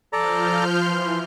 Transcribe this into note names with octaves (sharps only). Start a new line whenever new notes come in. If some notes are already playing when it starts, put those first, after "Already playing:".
F3 A4 D5 A#5 F6 G6
E3 C6